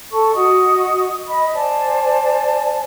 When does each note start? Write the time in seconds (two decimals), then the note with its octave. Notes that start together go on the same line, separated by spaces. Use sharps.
0.11 A4 A5 C#6
0.35 F#4 D#5 D#6
1.28 D#5 B5
1.54 C5 D5 G#5 A5